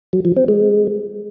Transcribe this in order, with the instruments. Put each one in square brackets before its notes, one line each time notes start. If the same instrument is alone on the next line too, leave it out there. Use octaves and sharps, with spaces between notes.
[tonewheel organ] F#3
F3
C4
G#3